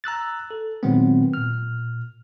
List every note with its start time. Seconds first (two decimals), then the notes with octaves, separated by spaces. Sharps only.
0.04 A#5 E6 F#6 A6
0.51 A4
0.83 A#2 D#3 F#3 G#3 B3 C4
1.34 A#2 F6